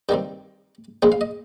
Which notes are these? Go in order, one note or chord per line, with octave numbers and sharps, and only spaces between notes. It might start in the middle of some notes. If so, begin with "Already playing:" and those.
G2 D#3 G3 C4 G5
A#1 A#2 F3 G#3 G5
F5
D#5